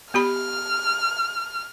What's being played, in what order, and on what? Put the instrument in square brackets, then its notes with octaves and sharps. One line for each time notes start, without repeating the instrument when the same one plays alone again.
[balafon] B3 G4 B5 [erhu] F6